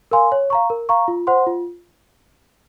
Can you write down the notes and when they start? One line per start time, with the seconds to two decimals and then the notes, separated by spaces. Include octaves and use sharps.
0.11 A#4 F5 G#5 C6
0.32 C#5
0.50 F5 A#5 C#6
0.70 A#4
0.89 F5 A#5 C#6
1.08 F4
1.27 C5 F#5 C6
1.47 F4